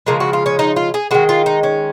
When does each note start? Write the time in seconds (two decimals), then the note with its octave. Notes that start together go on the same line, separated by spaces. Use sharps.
0.07 C#3 F3 G#3 A#4
0.20 F#4
0.33 F4
0.46 C#4
0.59 D#4
0.76 F4
0.94 G#4
1.11 D#3 G#3 F#4
1.29 F4
1.46 D#4
1.63 C#4